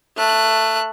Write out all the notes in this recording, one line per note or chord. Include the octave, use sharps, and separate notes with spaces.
A3 F#6